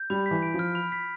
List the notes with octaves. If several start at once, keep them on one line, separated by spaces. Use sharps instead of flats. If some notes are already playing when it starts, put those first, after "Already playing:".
Already playing: G6
G3 B5
B6
E3
D7
F3
F6
B5
B6